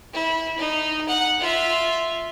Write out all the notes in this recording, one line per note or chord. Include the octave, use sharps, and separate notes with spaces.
E4
D#4
F#5
F4 E5